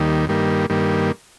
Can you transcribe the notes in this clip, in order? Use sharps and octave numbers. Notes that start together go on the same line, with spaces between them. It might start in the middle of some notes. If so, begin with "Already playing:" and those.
Already playing: D#2 D#3 G3 A#3
G2 D#3 G3 A#3
G2 D#3 G3 A#3